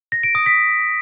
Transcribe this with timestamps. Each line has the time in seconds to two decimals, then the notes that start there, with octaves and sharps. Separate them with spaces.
0.12 A#6
0.23 D7
0.35 D#6
0.46 B6